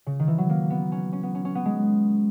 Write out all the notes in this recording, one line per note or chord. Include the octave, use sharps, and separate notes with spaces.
C#3
D#3
E3
F#3
A#3
B3
C#4
C#4
B3
C#4
C#4
B3
G#3